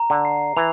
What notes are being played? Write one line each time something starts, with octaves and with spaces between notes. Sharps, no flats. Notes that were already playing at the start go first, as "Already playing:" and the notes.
Already playing: A#5
D3
C7
E3 F7